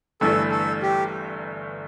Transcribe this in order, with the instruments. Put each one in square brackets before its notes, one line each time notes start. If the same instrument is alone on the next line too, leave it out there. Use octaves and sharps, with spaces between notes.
[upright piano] G1 G2 E3 A3 [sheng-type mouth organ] A4
[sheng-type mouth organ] A4
G4